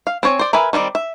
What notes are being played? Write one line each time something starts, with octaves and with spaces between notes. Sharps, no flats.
F5
C4 C5 C#5 G#5
C5 D5
A#4 B4 E5 G#5
D#3 G3 C4 D5
E5